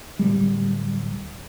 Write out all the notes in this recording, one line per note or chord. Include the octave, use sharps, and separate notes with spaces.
D1 G3